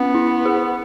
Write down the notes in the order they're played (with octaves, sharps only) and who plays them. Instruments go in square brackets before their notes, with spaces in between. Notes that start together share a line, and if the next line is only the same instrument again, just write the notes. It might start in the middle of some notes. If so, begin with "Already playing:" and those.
Already playing: [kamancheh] B3 [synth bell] C#4
[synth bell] E4
G#4